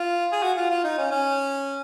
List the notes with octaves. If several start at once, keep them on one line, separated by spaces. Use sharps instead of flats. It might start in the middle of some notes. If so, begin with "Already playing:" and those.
Already playing: F4
G#4
F#4
F4
F4
D#4
C#4
C#4